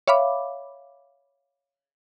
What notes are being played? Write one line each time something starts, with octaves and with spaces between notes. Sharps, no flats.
C#5 E5 F5 B5 D6